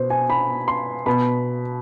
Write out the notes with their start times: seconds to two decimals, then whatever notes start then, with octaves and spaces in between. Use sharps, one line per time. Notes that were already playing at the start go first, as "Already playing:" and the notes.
Already playing: B2 C5
0.10 G#5
0.30 B5
0.68 C6
1.06 B2 B5